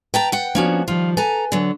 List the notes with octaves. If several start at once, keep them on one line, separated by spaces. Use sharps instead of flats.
B4 G5 A5 A#5
F#5 G5
F3 A#3 B3 C#4 D4 F#4
D#3 F3 G3 F4
A4 B4 G#5 A#5
D3 F#3